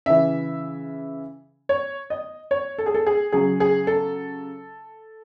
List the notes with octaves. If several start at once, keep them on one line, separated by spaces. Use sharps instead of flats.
C#3 E3 E5
C#5
D#5
C#5
A4
G#4
A4
G#4
C#3 F#3 G#4
G#4
A4